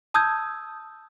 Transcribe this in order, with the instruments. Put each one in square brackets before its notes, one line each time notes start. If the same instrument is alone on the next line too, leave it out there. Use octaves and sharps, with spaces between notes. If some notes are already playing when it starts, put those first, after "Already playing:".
[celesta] A5 D#6 E6 G6 G#6